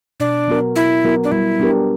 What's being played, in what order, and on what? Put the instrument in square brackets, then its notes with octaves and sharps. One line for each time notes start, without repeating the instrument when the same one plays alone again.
[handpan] B2 [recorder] D4
[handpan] F#3 B3 F#4 A#4
[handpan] B2 [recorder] E4
[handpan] F#3 B3 F#4 A#4
[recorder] D4
[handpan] G3 [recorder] E4
[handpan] B3 D4 G4 A#4